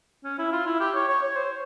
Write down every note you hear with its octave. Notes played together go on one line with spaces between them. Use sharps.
C#4
E4
F4
E4
G4
C#5
C#5
C#5
C5